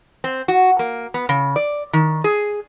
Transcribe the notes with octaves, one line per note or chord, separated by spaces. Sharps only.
C4
F#4
A#3
B3
C#3
D5
D#3
G#4